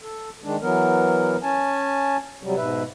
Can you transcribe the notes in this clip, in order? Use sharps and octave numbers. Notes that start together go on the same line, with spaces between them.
A4
D#3 G#3 D4
E3 F#3 B3 A#4
C#4 G#5 A5
C3 F#3 G3
G#2 B2 B4 E5